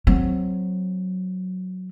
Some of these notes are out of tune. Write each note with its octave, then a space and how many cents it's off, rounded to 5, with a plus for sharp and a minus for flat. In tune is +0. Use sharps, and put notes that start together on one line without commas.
F#3 +0 C4 +0